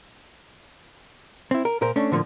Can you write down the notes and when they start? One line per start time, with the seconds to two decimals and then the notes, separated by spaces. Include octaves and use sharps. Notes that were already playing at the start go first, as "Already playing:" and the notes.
1.51 C4 E4
1.65 A#4
1.81 A#2 A#4 C5
1.96 A3 C#4 D4
2.12 A2 D3 F3 F#3 A#3